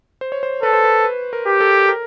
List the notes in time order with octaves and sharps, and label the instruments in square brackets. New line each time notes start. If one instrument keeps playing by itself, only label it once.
[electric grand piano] C5
C#5
C5
[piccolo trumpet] A4 [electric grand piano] B4
[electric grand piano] C5
B4
B4
A#4
[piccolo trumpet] G4
[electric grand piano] A4
A#4